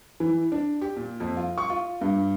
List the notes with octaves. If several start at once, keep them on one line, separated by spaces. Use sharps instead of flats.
E3
D4
G4
A#2
F2
F4
C#6
F4
G2